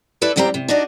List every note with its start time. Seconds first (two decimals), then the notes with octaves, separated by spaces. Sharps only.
0.22 E4 A4 B4 D5
0.36 E2 C3 G3 C4 G5 A#5
0.54 C3
0.68 D4 D#4 F#4 D5